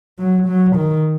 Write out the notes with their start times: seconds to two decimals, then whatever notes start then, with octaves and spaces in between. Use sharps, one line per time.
0.18 F#3
0.47 F#3
0.75 D#3